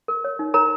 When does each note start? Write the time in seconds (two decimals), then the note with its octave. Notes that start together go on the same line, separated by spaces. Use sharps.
0.08 A#4
0.24 C#5
0.39 D#4
0.54 A#4 C#5 A#5